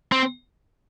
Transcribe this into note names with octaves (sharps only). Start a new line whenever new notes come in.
C4